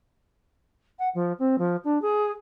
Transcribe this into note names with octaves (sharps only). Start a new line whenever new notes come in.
F#5
F3
C4
F3
D4
G#4